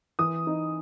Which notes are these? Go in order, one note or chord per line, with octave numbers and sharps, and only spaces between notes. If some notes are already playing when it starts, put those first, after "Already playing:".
E3 D#6
D#4